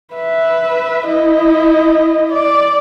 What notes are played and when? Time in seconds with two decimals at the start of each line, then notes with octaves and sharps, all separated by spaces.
0.14 B4 E5
1.09 E4 D#5
2.32 D5